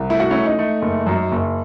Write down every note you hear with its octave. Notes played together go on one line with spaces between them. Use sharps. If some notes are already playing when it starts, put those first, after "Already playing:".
Already playing: C2
A3 E4
F#4
A3 C#4 E4
D#4
A3
F#1
F#2
F#1